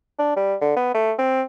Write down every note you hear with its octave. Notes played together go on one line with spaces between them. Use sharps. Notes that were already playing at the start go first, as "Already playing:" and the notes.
D4
G3
D3
B3
A3
C4